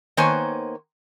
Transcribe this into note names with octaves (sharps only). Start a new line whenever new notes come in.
D#3 A#3 B3 C5 C#5 G#5